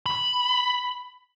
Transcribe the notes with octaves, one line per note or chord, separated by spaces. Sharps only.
B5